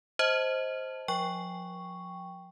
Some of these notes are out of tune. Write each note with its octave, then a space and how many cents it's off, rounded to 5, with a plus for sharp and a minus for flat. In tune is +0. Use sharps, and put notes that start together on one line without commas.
C5 +0 D#5 +20 A5 +0
F3 +40 G5 +0 C#6 +0